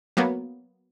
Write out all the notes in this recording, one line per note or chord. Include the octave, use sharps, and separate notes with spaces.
F#3 A#3 B3